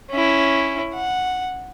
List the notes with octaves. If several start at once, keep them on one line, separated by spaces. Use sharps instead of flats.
C#4 E4
F#5